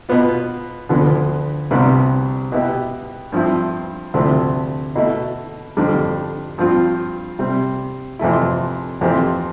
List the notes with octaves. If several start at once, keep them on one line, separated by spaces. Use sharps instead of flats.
B2 B3 F4
D2 D3 F3 B3
C2 C3 G3 B3 D4
B2 B3 E4 G4
G2 F3 C4 E4
D2 C3 F3 A3 E4
B2 A3 E4
F2 D3 G3 D4
G2 F3 C4 F4
C3 G3 C4
F2 C3 E3 A3 E4
F2 E3 A3 C4 G4